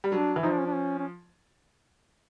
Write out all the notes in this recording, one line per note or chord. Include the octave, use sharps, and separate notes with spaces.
G3
F#3 D4
E3
F3 D#4
D4
C#4
D4
C#4
C#4